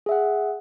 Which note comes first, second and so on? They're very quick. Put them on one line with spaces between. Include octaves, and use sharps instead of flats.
G#4 E5 F#5